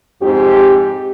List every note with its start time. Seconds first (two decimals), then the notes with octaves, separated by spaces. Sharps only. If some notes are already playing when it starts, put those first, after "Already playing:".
0.22 F2 G#2 C4 G4